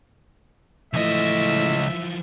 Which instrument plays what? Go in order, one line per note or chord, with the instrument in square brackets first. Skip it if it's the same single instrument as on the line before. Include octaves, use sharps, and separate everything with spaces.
[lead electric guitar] C#2 D#5 [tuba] A2 [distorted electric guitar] E3 F3 [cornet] E5